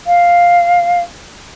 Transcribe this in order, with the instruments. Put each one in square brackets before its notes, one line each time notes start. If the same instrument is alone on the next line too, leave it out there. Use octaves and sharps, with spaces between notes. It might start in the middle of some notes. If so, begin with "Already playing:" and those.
[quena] F5